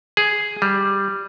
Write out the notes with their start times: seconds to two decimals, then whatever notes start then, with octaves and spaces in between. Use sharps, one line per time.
0.17 G#4
0.62 G3